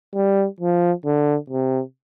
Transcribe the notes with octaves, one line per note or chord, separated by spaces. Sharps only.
G3
F3
D3
C3